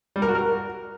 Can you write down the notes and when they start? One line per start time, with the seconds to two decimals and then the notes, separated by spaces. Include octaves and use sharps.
0.16 G3
0.22 A#4
0.28 F#4
0.35 A#4